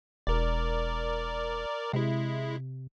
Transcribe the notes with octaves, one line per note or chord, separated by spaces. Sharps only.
E1 A#4 D5
C3 G#3 E4